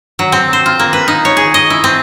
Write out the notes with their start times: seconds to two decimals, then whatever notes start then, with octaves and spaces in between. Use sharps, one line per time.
0.19 F#3
0.32 C4
0.53 C5
0.66 F4
0.79 A#3
0.93 B4
1.08 D#4
1.25 C#5
1.37 G#4
1.54 D#5
1.70 E4
1.84 C4